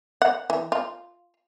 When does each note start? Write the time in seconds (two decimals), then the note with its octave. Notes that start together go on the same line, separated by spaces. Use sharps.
0.22 F#5
0.50 E3
0.72 F4